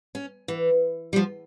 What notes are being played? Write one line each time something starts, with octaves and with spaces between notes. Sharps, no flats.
C#4
E3
G3
F3